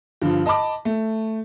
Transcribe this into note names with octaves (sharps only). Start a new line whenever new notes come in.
G2 D3 F3
D#5 A5 B5 D6
A3